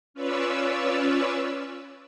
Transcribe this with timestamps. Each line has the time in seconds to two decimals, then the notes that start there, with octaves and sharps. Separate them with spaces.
0.14 C#4 F4 B4 C#5 D5 E6